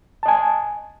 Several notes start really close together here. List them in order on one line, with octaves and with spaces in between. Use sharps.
A5 D#5 G#5